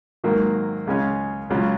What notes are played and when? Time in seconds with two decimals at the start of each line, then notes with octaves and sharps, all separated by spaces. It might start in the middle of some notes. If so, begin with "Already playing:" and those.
0.24 G#2 D#3 F#3 A#3
0.87 C#2 C#3 G#3 C#4
1.50 C#2 C#3 F#3 C#4 F4